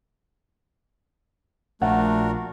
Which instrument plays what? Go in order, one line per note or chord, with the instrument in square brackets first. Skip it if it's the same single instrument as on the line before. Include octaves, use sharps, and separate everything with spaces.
[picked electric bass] A#1 [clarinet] A3 [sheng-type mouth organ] D4 F#4 A#4 [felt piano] F#5